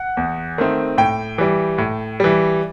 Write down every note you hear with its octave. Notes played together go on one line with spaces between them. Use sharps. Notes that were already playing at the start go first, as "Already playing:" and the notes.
Already playing: F#5
E2
D#3 A3 C4
A2 G5
E3 G3
A2
E3 G3